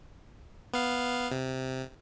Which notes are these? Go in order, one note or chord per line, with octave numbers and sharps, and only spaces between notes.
B3 F5
C3